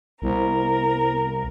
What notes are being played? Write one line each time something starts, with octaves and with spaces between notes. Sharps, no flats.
C2 B3 E4 A#4 C5